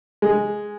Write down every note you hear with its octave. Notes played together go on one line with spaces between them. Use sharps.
G#3